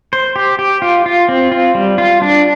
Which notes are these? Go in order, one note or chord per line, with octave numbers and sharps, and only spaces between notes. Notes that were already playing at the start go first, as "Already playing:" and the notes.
C5
G4
G4
F4
F4
C4
F4
G3
F4
D4